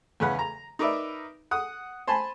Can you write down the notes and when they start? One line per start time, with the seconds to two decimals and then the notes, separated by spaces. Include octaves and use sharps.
0.20 E2 C#3 B4 F#5
0.39 A#5
0.79 D#4 A#4 B4 D5 E5
1.51 F#5 D#6
2.07 C5 G#5 A5 B5 C6